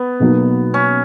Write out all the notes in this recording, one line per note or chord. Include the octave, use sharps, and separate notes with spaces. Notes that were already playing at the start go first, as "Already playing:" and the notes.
Already playing: B3
B1 B2 F#3 A#3 D#4
C#4